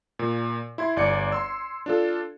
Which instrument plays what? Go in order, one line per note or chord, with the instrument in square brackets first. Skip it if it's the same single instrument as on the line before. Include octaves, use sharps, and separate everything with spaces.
[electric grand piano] A#2
E4 C6 G#6
G1 D5 D6 C#7
C6 E6
D4 F4 A4